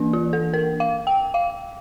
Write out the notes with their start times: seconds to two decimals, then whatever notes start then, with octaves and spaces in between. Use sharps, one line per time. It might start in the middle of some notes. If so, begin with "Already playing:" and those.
Already playing: E3 A#3 D4
0.13 F4
0.33 A4
0.54 A#4
0.80 F5
1.07 G5
1.34 F5